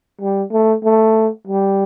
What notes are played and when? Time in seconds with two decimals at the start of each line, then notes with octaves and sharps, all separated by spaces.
0.21 G3
0.52 A3
0.84 A3
1.48 G3